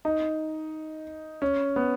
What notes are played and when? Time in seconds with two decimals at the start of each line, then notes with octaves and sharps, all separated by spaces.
0.05 D#4
1.42 C#4
1.76 B3